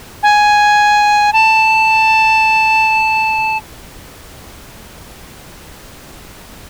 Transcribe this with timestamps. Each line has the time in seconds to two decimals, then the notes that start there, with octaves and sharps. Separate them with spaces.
0.23 G#5
1.33 A5